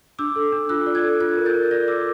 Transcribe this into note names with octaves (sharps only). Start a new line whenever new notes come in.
D4 D6 E6
A4
D4
F4 E6 F#6
D5
F#6 G#6
A4
F4 F#6 G#6
A#4
G6 A6
A#4
D5 G#6 A#6
A#4 D6 E6